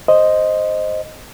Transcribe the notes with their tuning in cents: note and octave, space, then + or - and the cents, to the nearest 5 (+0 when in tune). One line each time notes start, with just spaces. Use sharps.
C5 +0 D#5 +0